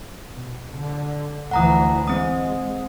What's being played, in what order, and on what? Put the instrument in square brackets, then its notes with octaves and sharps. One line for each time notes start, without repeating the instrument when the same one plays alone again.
[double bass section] B2
D3
[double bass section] D2 E3 F3 [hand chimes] F#5 A#5 D#6
[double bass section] G#3 [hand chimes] C4 D#6